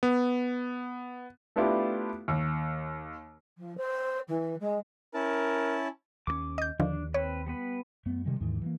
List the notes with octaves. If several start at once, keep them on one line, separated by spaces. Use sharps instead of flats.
B3
A3 B3 D4 E4 F4 G4
D#2
F3
C5
E3
G#3
C#4 E4 A#4 A5
D#2 G#3 C#4 D6
D#5 G6
D#2 D3 D#3 F3 D4
C4 B4 C#5
G3 B3 B4
F#2 A3 B3
C3 D#3 G3 G#3
D#2 G#2 D#3 E3
E3 F#3 A#3